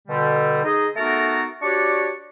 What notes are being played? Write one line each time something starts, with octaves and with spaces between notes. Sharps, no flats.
B2 D3 G3
D#4 G#4 D#5
A3 B3 D#4 F#4 A4 A#4
D4 F#4 G4 C#5 D5 C#6